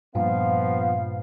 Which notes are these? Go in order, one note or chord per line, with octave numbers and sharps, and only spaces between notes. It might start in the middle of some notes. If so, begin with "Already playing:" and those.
G2 A#2 F3 B3 F5